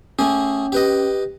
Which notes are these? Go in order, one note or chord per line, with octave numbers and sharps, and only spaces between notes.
A3 C#4 G#4
G4 B4 D#5